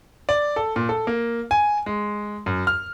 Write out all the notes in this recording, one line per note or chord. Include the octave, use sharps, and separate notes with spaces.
D5
A4
A#2
A4
A#3
G#5
G#3
F#2
F6